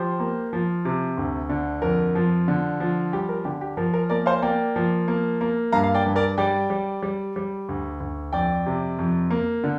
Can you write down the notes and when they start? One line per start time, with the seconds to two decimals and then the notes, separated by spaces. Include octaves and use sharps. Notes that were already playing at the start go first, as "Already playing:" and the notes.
Already playing: F3 G4 C5
0.20 A#3
0.53 F3
0.85 C3
1.17 D2
1.49 D3
1.82 F2 A#4
2.15 F3
2.48 D3
2.80 F3
3.13 G3 G4
3.29 A#4
3.45 D3 G4
3.61 G4
3.77 F3 A#4
3.94 A#4
4.10 A#3 A#4 D5
4.26 C5 F5
4.42 A#3 D5 G5
4.76 F3
5.08 A#3
5.41 A#3
5.72 G2 F5 A#5
5.84 F5
5.94 D5 G5
6.06 G2
6.16 A#4 D5
6.38 G3 D5 G5
6.70 G3
7.03 G3
7.36 G3
7.69 D2
8.00 D2
8.33 F2 D5 G5
8.66 C3
8.99 F2
9.30 A#3
9.64 D3